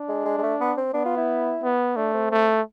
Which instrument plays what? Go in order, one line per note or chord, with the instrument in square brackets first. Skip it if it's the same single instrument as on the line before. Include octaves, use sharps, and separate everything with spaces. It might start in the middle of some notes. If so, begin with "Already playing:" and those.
Already playing: [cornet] D4
[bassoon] G#3
G#3
G#3
A3
B3
C4
[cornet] B3 [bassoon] D4
[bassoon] F4
E4
[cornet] B3
[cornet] A3 [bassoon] D4
[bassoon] C4
[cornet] A3